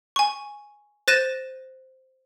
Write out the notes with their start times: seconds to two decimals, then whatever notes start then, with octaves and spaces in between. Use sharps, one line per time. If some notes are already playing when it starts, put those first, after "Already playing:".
0.16 G#5 C#6
1.08 C5 F#6 A6 A#6 D#7 E7